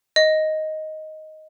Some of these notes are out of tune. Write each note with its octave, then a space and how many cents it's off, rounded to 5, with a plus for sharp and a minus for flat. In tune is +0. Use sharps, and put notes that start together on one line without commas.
D#5 +5